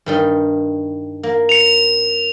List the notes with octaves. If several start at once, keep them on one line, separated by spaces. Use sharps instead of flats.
G2 D#3 G3
A#3
C#7 F7